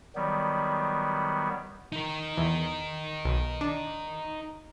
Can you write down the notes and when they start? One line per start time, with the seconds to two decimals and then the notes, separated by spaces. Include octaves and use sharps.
0.16 D#3 F#3 G3 B3
1.92 D#4 A#4
2.37 E2
3.25 B1
3.61 D4